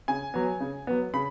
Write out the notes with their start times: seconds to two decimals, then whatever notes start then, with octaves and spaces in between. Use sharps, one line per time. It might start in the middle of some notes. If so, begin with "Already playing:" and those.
0.08 C#3 G#5
0.34 F#3 B3
0.61 C#3
0.87 F#3 B3
1.14 C#3 B5